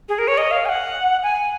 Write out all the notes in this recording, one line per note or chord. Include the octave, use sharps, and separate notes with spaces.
G#4
A#4
C#5
D#5
F5
G#5
F#5
G#5